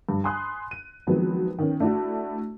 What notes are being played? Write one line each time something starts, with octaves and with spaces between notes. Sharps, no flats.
G2
G#5 B5 C6 D#6 F#6
D#7
D#3 F3 F#3 G#3 B3 C4
D#3 B3 C#4
A3 D4 E4 F#4